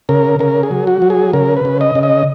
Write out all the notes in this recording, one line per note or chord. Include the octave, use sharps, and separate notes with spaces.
C#3 A#4
C#3 A#4
G#4
F#3
F#4
F#3
G#4
C#3 A#4
B4
C#3
D#5
C#3
D#5